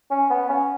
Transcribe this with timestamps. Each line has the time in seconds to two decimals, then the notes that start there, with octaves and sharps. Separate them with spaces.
0.11 C#4
0.30 B3
0.49 C#4